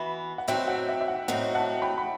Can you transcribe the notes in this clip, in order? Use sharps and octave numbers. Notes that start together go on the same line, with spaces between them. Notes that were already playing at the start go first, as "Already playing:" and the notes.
Already playing: E3 B3 F#4 B5
F#5
A2 F#3 C4 D#4 F#4 E5 G5
F#5
E5
E5
F#5
A2 F#3 C4 D#4 F#4 F#5
F#5 A5
G5 B5
B5